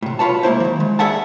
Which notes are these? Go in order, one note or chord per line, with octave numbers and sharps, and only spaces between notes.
A2 C3
C2 F4 B4 C#5 A5
G#3 A#3 E4 C5
D#3 F3
G#3
G#4 D5 E5 F#5 A5